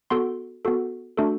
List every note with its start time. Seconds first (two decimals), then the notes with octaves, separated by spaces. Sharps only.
0.10 B3 F#4 A4 C6
0.65 B3 F#4 A4
1.17 A3 D4 F#4 A4